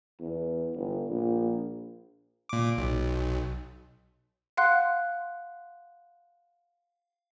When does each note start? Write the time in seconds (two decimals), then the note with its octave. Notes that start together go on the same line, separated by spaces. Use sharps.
0.20 E2
0.76 G1
1.10 A#1
2.49 A#2 D6
2.77 B1
4.57 F5 F#5 C6 F#6